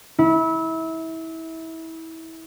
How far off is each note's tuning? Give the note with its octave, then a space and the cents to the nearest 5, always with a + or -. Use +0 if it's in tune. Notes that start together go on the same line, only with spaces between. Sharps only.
E4 -25